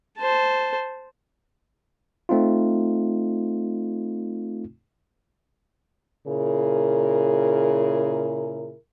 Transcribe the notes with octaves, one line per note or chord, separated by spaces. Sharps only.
C5 A5
A3 C4 D#4 F4
A#2 C#3 E4 G#4 A#4